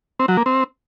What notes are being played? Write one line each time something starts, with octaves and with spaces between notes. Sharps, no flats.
C4
F#3
A#3
C4